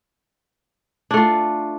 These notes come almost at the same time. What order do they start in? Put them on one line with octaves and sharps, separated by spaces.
D4 A3 F4